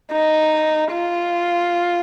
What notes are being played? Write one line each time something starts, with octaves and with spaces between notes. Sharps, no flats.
D#4
F4